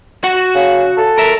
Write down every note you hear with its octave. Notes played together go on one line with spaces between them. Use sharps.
F#4 F#5
C#3
A4
A#4 E5